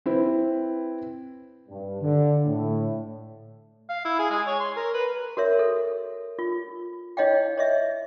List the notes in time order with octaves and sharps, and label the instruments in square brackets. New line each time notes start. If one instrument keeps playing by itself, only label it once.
[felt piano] C4 E4 B4
[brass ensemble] G2
D3
A2
[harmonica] F5
E4
G#4
G#3
C#5
C6
A#4
B4
[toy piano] F#4 A#4 C#5 E5
A4
F4
E4 C#5 D#5 F5 G5
C#5 D#5 E5